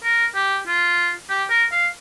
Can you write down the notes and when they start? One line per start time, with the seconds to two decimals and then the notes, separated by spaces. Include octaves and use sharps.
0.03 A#4
0.35 G4
0.67 F4
1.29 G4
1.50 A#4
1.72 F5